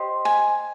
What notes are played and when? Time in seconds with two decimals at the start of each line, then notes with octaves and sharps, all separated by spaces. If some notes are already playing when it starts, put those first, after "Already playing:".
Already playing: G4 C5 D#5
0.25 G#5